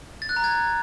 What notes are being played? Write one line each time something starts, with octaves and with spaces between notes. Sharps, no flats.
A6
F#6
A#5
G#6